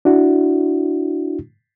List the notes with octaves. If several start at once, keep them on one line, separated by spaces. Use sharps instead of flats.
D4 E4 F#4